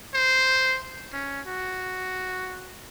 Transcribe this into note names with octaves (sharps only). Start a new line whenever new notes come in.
C5
C#4
F#4